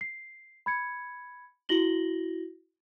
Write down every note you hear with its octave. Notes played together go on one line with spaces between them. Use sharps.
C7
B5 G#6 C#7
E4 F#4 A#6 F#7 G7